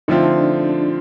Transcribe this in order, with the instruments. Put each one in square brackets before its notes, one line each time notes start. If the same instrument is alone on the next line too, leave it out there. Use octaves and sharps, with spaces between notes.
[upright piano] D3 F3 A3 C4 F4 [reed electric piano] D#4
[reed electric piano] D4
D4